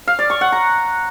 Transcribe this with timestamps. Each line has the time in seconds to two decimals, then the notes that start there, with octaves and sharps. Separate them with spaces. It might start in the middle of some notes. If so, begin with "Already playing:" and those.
0.08 F5
0.19 D5
0.30 C#6
0.41 F#5
0.52 A#5